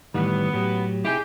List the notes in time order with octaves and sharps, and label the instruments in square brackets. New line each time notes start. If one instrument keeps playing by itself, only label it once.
[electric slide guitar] A2 E3 G3 [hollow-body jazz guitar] D#3 [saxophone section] B3
[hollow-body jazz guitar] A2 [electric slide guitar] F#3 G4
[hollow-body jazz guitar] C3 D#4 E4 [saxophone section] G4 [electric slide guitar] G#4 G#5